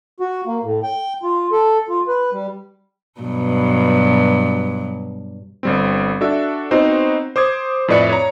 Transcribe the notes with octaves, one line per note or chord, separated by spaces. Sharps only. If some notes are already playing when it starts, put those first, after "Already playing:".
F#4
A#3
A2
G5
F4
A4
F4
B4
G3
G2 B2 F#3
G1 G3 C4
D4 F#4 A4 E5
B3 C4 D#4 F#4 C5
C5 D6 D#6 G#6
F2 A2 B4 D5 E5 C#7
C#5 A#5